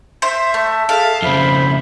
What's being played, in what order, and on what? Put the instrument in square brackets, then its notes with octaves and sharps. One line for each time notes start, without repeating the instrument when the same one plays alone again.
[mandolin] C5 [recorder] E5
[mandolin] A3
[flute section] G#4 A4 E5 [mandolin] F5 [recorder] A5
[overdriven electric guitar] F2 C#3 [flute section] C5 B5 [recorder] E5